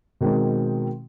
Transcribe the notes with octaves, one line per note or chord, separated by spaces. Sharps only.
B2 D#3 G#3 C4 D#4